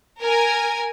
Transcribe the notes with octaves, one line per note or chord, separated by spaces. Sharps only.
A#4 G#5